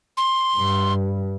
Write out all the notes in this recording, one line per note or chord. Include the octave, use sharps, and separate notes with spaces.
C6
G2